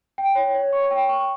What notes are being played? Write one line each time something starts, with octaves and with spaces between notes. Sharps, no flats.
G5
C#5
C#5
C#6
G5
C#6